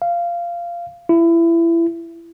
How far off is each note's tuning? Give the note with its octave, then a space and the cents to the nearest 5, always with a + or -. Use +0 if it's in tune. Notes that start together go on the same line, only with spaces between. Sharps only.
F5 -15
E4 +25